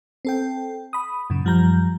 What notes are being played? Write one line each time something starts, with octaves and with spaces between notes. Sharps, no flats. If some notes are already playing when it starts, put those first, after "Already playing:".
C4 A4 G5
B5 D#6
F#2 A#2 C#3
F#2 F3 G3 A#5 G6